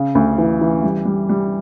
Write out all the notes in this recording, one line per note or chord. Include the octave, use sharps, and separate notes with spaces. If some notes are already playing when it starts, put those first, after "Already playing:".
Already playing: C#3
D2
E3
E3
G3
G3
G3